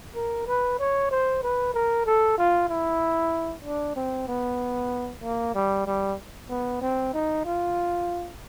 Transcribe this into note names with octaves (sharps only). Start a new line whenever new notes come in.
A#4
B4
C#5
C5
B4
A#4
A4
F4
E4
D4
C4
B3
A#3
G3
G3
B3
C4
D#4
F4